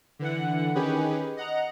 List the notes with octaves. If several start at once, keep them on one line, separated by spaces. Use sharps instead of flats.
D3 E3 F#5
D#3 C#4 G4 G#4 B4
D#5 F#5 A#5